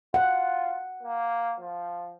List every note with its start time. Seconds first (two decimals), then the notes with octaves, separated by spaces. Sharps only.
0.14 F4 F#5
1.03 A#3
1.60 F3